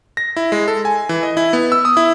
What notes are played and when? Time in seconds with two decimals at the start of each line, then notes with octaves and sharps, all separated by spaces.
0.17 A#6
0.37 E4
0.52 G#3
0.68 A4
0.85 G#5
1.09 E3
1.23 D#5
1.37 E4
1.53 B3
1.72 E6
1.85 D#6
1.97 E4